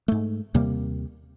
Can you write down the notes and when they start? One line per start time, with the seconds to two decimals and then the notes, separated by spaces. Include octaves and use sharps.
0.08 G#2 A3
0.54 D#2 C3 G3 A#3